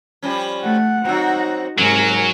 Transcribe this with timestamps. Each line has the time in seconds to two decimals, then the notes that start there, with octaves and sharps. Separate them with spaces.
0.22 F3 G3 C#4
0.63 A3 F#5
1.05 F#3 C4 D#4 F#4
1.78 G#2 C3 F#3 A#4 G#5